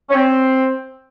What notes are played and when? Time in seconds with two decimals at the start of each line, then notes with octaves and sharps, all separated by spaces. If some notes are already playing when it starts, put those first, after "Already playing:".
0.10 C#4
0.14 C4